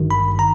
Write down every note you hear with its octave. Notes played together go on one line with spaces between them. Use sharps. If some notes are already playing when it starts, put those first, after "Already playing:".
Already playing: G#1 G2 D#3
B5
A#5